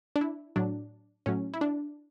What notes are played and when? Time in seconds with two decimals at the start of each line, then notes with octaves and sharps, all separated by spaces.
0.16 D4
0.21 E4
0.56 A2 F#3 D4
1.26 A2 F#3 C#4
1.54 E4
1.61 D4